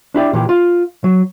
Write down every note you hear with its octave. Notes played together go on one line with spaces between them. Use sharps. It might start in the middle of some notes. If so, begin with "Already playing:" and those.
D4 E4 G4 D5
A#2 E3 G4
F4
F#3